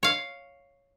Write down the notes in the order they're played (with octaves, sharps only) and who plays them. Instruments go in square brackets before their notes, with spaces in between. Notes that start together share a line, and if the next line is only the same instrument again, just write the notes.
[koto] C#5 F5